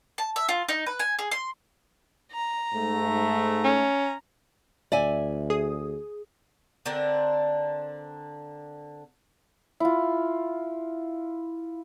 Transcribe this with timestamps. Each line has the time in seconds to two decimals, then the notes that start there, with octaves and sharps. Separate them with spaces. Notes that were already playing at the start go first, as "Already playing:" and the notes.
0.18 A5
0.36 E5
0.49 F4
0.69 D#4
0.86 B4
0.99 G#5
1.19 G#4
1.31 C6
2.32 A#5
2.73 G#2 A3
3.64 C#4
4.92 D2 D5 E5 G#5
5.50 G#4 D#6
6.86 D3 C4 D4 A#4
9.80 E4 F4